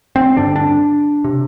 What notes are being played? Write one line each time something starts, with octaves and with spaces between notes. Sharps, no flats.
C4
G2 D3 D4
D4
C3